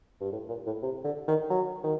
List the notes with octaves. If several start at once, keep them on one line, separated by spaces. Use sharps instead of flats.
G2
A2
A#2
A2
C3
D3
D#3
F#3
D#3